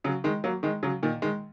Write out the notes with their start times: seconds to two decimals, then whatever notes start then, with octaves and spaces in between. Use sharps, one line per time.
0.04 C#3 F#3
0.24 D#3 G#3
0.44 F#3 A#3
0.63 D#3 G#3
0.83 C#3 F#3
1.03 A#2 D#3
1.22 D#3 G#3